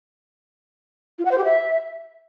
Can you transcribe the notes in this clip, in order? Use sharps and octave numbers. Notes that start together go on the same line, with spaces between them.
F4
F#5
C5
G4
E5